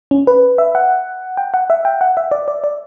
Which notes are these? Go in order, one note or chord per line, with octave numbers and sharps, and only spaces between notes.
C#4
B4
E5
F#5
G5
F#5
E5
G5
F#5
E5
D5
D5
D5